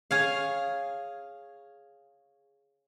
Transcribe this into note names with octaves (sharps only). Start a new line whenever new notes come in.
G#4 C#5 F5